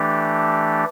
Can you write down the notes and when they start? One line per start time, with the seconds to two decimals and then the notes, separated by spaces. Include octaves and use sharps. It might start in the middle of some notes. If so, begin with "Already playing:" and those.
Already playing: E3 A3 D4 G4